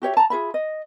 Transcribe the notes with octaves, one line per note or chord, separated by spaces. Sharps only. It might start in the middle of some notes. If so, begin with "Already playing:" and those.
F#4 G4 C#5 E5
A5 A#5
F4 G#4 E5 B5
D#5